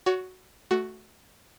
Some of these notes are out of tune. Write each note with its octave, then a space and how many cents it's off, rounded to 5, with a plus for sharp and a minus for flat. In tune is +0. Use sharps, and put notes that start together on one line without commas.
F#4 +0 C#5 +30
A3 -10 F#4 +5